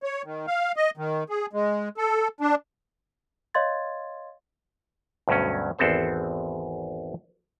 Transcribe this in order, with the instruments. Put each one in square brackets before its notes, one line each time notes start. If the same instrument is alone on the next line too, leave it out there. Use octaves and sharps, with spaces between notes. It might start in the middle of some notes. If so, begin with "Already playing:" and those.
[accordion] C#5
D#3
F5
D#5
D#3
G#4
G#3
A4
D4
[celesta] C#5 D#5 F5 C6 G#6 A6
[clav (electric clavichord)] D2 G2 B2 F#3 C#4
G#1 E2 B3 C4 A4 C5